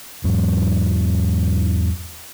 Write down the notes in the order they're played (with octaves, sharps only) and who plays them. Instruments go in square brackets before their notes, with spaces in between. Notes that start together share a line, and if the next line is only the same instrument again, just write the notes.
[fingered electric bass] E2 G#2 F#3